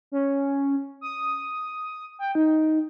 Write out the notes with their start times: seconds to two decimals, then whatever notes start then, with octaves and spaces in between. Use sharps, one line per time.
0.12 C#4
1.01 D#6
2.19 G5
2.35 D#4